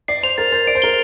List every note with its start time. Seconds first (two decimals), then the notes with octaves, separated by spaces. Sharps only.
0.08 D5 C7
0.23 C5 F7
0.38 A#4 A6
0.52 C5 A6
0.67 D5 D7
0.75 C5
0.82 A#4 G7